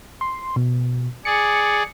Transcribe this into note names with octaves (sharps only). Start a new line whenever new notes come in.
C6
B2
G#4 D5 C#7